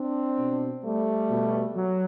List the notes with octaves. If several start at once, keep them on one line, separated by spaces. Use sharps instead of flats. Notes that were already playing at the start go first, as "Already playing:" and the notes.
Already playing: C4 D4
B2
G3 A3
B2
F#3